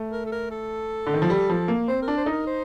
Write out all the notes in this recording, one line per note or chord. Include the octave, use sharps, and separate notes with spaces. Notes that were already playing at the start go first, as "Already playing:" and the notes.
Already playing: A3
A#4
A4
A#4
A4
D3
D#3
F3
G3
F3
A#3
C4 C5
A#4
D4
C5
D#4 A4
A#4
C5